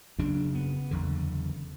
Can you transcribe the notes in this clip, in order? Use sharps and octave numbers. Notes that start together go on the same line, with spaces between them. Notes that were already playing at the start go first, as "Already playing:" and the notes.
F#1 F#2 C#3 D4
B3
F#1 E2 D3